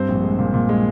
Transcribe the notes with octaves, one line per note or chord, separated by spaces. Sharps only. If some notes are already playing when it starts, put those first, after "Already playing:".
Already playing: G2 C4 C5
A#1
G#3
A#2
A#2
G#3